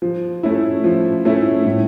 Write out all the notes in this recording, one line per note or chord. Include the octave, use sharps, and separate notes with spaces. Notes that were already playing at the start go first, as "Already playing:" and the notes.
F3
A3 C#4 E4
F3
A3 C#4 E4
A2